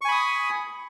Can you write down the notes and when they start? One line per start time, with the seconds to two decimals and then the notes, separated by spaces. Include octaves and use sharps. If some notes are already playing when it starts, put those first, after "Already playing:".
0.01 C#6
0.05 G#5
0.08 B5
0.12 D#6